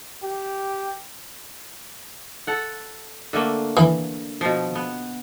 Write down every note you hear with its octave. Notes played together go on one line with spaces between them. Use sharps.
G4
A4 F#5
D3 A3 A#3
E3
B2 F3
B3